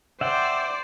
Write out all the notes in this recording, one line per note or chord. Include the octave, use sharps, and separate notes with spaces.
C5 D5 E5 F#5 G5